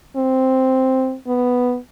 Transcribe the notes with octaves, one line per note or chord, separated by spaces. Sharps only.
C4
B3